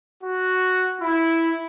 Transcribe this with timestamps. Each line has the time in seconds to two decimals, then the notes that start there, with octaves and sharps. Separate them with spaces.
0.24 F#4
1.01 E4